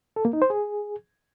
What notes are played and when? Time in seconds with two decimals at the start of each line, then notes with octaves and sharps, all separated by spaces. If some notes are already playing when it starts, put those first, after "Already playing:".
0.16 A4
0.25 A#3
0.33 D#4
0.42 C5
0.50 G#4